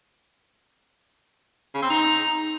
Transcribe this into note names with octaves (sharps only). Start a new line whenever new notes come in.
C#3
C4
D#4